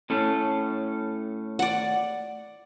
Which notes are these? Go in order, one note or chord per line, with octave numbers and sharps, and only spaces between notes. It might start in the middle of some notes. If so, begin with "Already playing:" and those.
A2 C#4 A4
D5 F#5